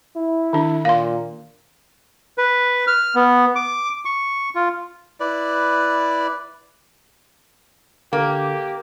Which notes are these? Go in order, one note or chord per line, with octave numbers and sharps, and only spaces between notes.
E4
D#3 D4
A#2 F5 C6
B4
F6
B3
D6
C#6
F4
E4 B4 D5
D3 A#3 G4